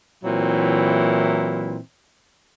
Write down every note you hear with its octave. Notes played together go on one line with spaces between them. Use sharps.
A#2 E3 F#3 C4 E4